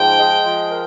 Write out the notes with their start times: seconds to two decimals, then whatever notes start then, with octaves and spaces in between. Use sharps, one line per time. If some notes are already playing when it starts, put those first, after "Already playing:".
Already playing: G#2 F3 G5
0.18 G#3
0.44 F3
0.70 A#4